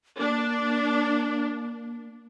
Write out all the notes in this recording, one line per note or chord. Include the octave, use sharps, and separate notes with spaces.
A#3 D4